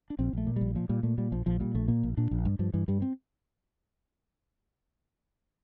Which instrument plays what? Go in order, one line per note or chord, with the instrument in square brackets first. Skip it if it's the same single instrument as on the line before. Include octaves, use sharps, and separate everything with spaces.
[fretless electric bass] D4
A#1 C4
A#1 A3
A#2
A#1 G3
A#2 F3
A#2 G3
A#2 A3
A#2 G3
A#1 F3
A#1 F3
A#2 G3
A#1 A3
A#2 A#3
A#1
A#2 D4
A#1
G2
G2 F3
G2 E3
G2 G3
C4